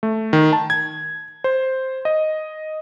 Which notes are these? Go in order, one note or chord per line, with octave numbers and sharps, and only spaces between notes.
A3
D#3
A5
G#6
C5
D#5